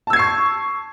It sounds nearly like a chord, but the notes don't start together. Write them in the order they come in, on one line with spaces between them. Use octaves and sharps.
A5 E6 G#6 C7 C#6